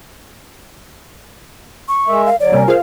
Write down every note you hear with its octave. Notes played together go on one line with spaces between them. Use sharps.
C#6
G#3 A#4 E5
F5
D3 F#3 C#5 D5
C3 G3 A#3 C#4 A#4
A#2 F4 G#4 A#4 C5 F5